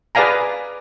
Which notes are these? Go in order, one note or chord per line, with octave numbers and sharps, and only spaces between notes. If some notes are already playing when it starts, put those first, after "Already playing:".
G#4 B4 D5 F5 G#5 A#5